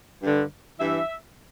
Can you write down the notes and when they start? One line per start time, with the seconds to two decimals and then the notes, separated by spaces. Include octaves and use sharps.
0.22 G2 D3
0.78 G2 E3 E5